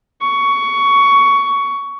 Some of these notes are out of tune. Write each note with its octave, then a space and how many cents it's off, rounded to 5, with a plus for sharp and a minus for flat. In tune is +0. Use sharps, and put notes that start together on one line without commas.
C#6 +15